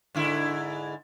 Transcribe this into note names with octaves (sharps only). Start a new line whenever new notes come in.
G#2 D3 E4